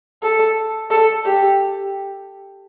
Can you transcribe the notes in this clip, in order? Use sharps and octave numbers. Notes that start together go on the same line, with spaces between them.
A4
A4
G4